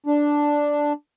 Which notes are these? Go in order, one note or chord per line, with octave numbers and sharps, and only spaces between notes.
D4